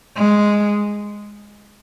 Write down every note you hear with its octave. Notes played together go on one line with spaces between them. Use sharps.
G#3